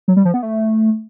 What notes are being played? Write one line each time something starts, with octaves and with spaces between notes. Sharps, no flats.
F#3
G3
F3
B3
A3